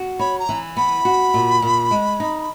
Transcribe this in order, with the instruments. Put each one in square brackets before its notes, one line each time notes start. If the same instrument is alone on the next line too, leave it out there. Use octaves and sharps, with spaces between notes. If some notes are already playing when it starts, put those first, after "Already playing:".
Already playing: [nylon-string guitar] F#4
[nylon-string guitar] C#5 [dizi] B5
[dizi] A#5
[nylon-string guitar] E3
[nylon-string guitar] B3 [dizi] B5
[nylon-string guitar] F#4
A#2
A#2
G#3
D#4